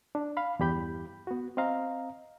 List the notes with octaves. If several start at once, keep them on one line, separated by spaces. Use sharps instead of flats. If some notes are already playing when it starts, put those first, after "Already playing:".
D4
F5 B5
E2 G2 G4 B5 G6
B3 F#4
C4 D#5 F5 A#5